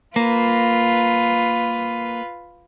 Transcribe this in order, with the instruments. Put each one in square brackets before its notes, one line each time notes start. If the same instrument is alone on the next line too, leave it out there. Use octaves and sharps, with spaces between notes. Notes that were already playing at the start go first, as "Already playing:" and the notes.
[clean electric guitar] A#3 [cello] F4 B4